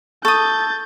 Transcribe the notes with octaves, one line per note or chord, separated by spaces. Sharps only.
A4 C#6 D#6 G6 A6